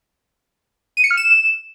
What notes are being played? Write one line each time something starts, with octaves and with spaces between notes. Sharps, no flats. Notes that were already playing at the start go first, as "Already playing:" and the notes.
D#7
C#7
F6
E7